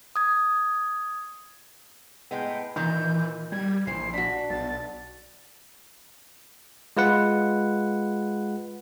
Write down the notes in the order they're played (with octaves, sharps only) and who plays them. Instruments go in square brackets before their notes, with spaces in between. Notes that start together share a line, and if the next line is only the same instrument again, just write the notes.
[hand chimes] D#6 G#6
[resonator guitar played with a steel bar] A2 G#3 B3 [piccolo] G5
[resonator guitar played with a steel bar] A#2 D#3 [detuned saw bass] E3 [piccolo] G6
[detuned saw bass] G3 [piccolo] G#6
[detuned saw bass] A#1 [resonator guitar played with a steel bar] E3 C5 [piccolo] C7
[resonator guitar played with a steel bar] D4 F#4 [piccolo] B6
[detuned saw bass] B1 [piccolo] A6
[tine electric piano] G#3 F4 B4 F#5